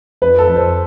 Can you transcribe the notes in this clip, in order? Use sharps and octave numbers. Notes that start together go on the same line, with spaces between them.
F2 B4
A4
F2
C5